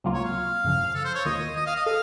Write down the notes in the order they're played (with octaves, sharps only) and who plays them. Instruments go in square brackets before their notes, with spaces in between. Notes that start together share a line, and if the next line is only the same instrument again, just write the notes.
[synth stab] C#2 C3 F#3 A#3 F4
[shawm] C#5
F5
[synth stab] F#2 C#3 F3
[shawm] A4
C5
C#5
[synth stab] D#2 D#3 A#3 F4 [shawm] D#5
[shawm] D#5
F5
D#5
[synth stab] A4 [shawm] F5